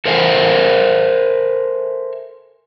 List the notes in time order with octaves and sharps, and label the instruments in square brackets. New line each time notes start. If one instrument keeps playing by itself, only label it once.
[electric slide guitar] A4 A#4 C5 E5 G#5